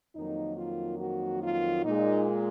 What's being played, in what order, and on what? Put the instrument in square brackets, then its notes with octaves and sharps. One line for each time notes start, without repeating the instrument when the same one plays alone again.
[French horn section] F2 D#3 F#3 A#3 D#4
F4
F#4
F4
A#2 G#3 D#4